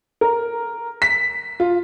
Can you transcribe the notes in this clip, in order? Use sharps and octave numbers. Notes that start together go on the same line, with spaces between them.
A#4
B6
F4